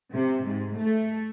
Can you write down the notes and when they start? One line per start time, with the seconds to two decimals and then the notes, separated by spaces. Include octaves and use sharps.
0.12 C3
0.47 G#2
0.78 A3